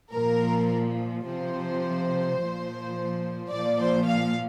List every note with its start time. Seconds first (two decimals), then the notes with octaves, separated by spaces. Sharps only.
0.13 A#2 F3 A#4
1.26 C3 F3 C5
2.40 A#2 F3
3.52 A#2 F3 D5
3.81 C5
4.08 F5